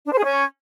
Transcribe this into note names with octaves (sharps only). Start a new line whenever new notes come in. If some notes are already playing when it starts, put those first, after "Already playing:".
D4
C5
G#4
C#4